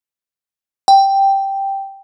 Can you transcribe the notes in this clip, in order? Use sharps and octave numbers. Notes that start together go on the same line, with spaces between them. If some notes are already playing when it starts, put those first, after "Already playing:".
G5